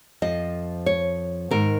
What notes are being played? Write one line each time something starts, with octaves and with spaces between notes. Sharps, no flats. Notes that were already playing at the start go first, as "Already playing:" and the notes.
F2 F3 D#5
C#5
G#2 D#3 A#4